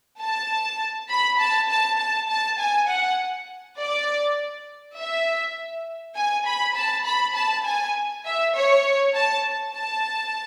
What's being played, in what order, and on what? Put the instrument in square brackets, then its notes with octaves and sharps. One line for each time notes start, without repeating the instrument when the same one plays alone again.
[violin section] A5
B5
A5
A5
A5
A5
G#5
F#5
D5
E5
G#5
B5
A5
B5
A5
G#5
E5
C#5
A5
A5